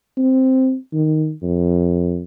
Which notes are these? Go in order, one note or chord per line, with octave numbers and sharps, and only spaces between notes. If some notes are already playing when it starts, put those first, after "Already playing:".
C4
D#3
F2